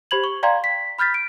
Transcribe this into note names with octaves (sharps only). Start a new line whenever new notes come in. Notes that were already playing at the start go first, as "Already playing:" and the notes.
G4 C5 B5 G#6 F#7
C#6
D5 F5 G5 A#5 C6 G#6
B6
B5 F6 G6 A6 B6
D7